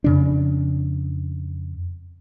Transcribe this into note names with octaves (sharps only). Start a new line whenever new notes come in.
F2 C#3 D4